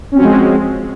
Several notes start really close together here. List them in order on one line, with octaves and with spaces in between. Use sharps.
C#4 C4 F#4 F3 G#3